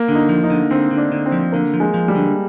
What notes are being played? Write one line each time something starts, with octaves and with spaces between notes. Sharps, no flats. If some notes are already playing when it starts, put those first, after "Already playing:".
Already playing: A#3
D3
D#4
F3
D#4
D3
D3 C4
D3
D4
D3
C4
F3
D3 A#3
F3
G#3
F3
G3
D3